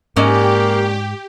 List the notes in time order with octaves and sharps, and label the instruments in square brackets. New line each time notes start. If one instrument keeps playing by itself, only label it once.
[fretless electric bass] G#2 [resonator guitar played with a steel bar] G#3 C#4 D5 [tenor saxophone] A#3 [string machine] G4